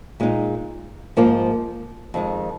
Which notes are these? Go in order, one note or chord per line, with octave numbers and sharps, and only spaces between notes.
A#2 G#3 D#4
G#2 F3 A#3 F4
F2 D#3 G#3